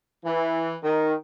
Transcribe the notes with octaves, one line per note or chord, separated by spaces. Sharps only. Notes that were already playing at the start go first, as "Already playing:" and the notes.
E3
D#3